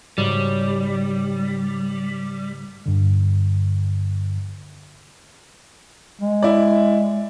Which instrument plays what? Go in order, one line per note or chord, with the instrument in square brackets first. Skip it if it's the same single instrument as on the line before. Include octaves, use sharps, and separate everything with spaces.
[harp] G#2 C#3 F#4 [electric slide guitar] G3
[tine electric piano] G2 D3
[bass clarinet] G#3
[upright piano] E4 D5